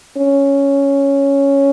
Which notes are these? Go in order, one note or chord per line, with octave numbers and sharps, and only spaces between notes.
C#4